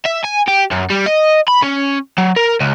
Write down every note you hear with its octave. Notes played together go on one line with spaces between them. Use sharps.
E5
G#5
G4
F#2
G3
D#5
B5
C#4
F#3
A#4
C#2